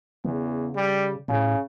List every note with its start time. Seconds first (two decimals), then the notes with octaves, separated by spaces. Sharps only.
0.25 E2 C#3
0.75 G3
1.28 A2 C#3